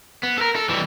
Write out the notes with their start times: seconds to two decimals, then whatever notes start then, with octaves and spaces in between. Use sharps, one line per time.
0.23 B3
0.38 A4 A#4
0.56 A4
0.69 E3 G3